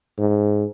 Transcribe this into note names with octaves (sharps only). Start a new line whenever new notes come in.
G#2